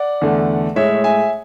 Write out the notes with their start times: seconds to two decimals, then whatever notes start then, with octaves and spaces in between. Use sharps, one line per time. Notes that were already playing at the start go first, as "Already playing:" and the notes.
Already playing: D5 F#5
0.21 E2 D3 A3
0.76 A2 G#3 C#5 E5
1.04 E5 G#5